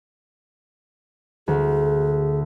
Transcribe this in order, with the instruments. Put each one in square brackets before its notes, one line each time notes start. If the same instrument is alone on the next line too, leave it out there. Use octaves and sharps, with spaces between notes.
[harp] D2 [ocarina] G#4